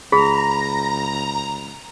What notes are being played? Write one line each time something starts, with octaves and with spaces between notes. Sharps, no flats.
C#2 G#4 A#5 B5